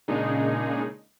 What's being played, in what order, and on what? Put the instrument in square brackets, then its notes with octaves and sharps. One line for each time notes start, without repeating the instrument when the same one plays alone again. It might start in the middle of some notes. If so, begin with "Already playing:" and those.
[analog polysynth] A#2 C#3 G#3 D4 D#4 G#4